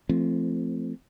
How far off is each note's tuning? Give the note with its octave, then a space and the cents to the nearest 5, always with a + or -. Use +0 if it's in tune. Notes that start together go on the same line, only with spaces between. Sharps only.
F3 -30 A3 +0 C4 +0